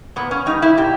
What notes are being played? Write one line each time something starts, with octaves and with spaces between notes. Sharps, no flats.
A#2 B3
C#4
G3 D#4
E4
A#2 G4